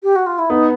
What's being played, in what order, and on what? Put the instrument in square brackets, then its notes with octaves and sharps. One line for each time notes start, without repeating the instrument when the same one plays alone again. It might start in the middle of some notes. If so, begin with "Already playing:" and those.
[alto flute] G4
F#4
F4
E4
[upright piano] B3 [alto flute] D#4